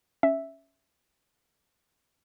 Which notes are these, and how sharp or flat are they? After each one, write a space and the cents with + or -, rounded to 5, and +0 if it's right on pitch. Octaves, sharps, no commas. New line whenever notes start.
C#4 +0 E5 +0